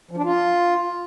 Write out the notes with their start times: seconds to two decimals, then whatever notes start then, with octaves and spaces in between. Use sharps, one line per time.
0.11 F3
0.17 D4
0.24 F4